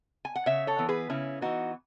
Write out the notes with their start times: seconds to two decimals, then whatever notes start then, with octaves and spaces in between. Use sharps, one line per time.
0.25 G#5
0.36 F#5
0.46 C#3 C#5 E5
0.67 A4 C#5
0.78 E3 B3
0.89 G#4 B4
1.10 C#3 C#4 E4
1.41 E3 B3 D#4 F#4